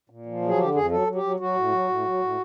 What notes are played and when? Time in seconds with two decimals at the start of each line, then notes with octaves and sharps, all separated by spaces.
0.10 A#2
0.26 F3
0.42 F#3 G#4
0.58 D3 G4
0.75 F2 G#4
0.91 F#3 A4
1.07 F#3
1.15 G4
1.23 F#3
1.40 F#3 F#4
1.56 A2
1.71 F#3
1.88 A2
2.05 F#3
2.21 A2